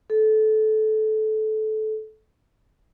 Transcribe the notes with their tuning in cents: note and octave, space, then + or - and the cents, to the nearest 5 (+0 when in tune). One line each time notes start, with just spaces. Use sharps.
A4 -20